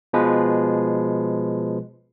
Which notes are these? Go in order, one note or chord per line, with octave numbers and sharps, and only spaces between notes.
B2 F3 G#3 B4